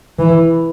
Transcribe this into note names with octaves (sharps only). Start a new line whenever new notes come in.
E3